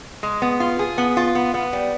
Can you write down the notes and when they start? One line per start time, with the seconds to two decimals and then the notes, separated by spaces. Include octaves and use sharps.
0.23 G#3
0.42 B3
0.60 F4
0.79 G#4
0.98 B3
1.17 F4
1.35 B3
1.54 B3
1.73 G3